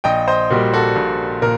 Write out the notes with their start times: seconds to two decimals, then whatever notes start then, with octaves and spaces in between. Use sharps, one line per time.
0.04 A#1 D#5 G5
0.28 C5 D#5
0.50 A#2 G3 A#3 F#4
0.74 F#4 A4
0.96 A#1
1.42 A#2 A#4